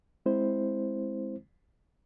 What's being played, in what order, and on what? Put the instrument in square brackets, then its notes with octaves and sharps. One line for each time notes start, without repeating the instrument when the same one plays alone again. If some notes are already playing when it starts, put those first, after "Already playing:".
[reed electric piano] G#3 C4 E4 C5